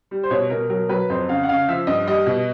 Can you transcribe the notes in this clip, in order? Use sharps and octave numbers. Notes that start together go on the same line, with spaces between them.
G3
C5
B2 C#5
B2 A#4
F#3 A#4
F#3 B4
F2 C5
C#3 F5
F#5
C#3 F5
F3 E5
G2 D#5
G3 D#5
B2